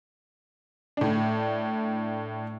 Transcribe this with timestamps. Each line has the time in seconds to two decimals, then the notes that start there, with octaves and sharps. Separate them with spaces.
0.97 A2 D4